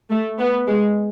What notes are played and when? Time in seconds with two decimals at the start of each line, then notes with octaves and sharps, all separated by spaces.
0.10 A3
0.39 B3
0.68 G#3